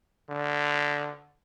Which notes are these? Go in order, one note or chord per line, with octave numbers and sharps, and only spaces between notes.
D3